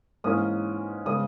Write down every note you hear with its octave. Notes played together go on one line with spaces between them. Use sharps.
G#2 E3 A#3 C#4 D#6
C#3 G#3 B3 D#6